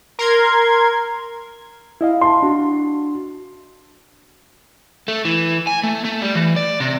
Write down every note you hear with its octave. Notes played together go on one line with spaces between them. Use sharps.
A#4 C6 G#6
E4 D#5 F5
A5 C6
D4 F#4
A3
E3
G#5
A3
A3
G3
E3
D5
C3